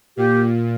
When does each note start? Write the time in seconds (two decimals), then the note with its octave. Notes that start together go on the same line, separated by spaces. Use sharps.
0.17 A#2 G4